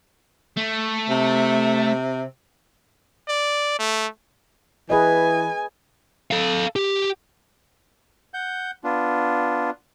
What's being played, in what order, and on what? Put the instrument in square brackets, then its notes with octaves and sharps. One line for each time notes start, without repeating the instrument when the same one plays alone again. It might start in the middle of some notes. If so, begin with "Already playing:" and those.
[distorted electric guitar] A3
[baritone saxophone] C3
[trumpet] D5
A3
[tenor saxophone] E3 [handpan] G#4 B4 D#5 [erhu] G#5
[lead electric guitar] A4 F5
G4
[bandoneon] F#5 G6
B3 D4 F4